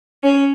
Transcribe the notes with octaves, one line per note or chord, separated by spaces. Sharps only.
C#4